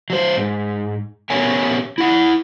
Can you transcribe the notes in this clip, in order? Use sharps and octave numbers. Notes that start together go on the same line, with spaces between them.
F#3 C5
G#2
B3 C#4 G4 A#4 C#5 G#5
E4 F#5